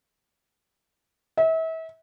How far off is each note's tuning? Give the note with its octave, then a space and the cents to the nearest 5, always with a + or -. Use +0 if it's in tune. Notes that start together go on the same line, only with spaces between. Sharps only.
E5 -35